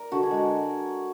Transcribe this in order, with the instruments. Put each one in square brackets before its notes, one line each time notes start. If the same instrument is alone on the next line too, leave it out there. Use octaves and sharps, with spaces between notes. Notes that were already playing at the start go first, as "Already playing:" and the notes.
Already playing: [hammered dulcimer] A#4 D5
D3 F#4
G#4
G#3 F#4